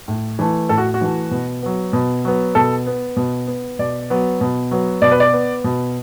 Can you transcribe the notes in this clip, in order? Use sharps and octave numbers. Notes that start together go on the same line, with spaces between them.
A2
E3 A3
A2 A4
F#4
F#4
E3 A3
B2
F#3 B3
B2
F#3 B3
B2 A4
B3
B2
B3
B2 D5
F#3 B3
B2
F#3 B3
B2 D5
B4
D5
B3
B2